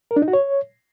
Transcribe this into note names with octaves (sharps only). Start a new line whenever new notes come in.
A#4
D4
D#4
F#4
C#5